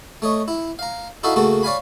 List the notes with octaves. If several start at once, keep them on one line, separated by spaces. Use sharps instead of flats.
A3 C#5 D#5
E4
F5 A#5
D#4 E4 F#4 A4 E5 F5
C#3 A3 A#3 F#4 A4
C#5 D5 F5 G#5 B5